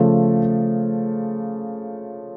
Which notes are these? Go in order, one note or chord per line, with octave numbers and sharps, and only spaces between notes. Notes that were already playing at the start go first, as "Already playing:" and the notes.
Already playing: C#3 F3 A3